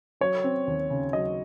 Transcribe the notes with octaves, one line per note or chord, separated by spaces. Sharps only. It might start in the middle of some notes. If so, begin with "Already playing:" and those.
F#3 C#5
C4
D#2
C#3
F#3 D#5